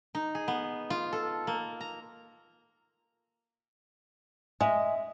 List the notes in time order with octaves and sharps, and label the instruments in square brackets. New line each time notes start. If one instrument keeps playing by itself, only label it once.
[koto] D#4
G#4
B3
F4
A4
A#3
A#5
[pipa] G#3 [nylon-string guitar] D#5 E5